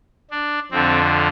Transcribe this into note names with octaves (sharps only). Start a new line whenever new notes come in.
D4
F2 D3 F3 C4